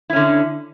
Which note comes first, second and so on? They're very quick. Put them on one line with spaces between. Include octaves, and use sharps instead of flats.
E4 C#4 D3